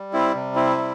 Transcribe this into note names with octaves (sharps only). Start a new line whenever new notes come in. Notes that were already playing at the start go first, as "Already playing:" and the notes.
Already playing: G3
C4 E4
C3
C4 E4
G3